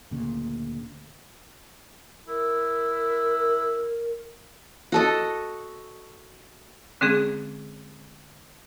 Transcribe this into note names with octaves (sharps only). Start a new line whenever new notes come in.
D2 A#2 C#3
E4 A#4
F#4 A4 D#5
D3 G#3 C4 C#4 G#4